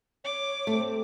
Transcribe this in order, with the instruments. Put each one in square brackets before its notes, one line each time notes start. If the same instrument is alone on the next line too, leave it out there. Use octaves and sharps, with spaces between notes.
[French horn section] C#5 [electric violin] D6
[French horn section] C3 C5 [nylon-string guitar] A3